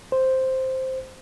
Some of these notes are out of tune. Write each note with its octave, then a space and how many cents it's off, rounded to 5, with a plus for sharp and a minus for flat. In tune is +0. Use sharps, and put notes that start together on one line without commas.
C5 +0